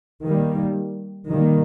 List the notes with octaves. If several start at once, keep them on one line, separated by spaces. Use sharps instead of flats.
D#3 G3 A#3
D#3 G3 A#3